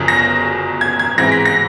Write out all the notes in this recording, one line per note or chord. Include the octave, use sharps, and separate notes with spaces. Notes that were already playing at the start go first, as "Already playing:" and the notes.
Already playing: G1 F#2 C#3 F3
A#6
G#6
G#6
G#2 E3 G#3 C4 A#6
B6
A#6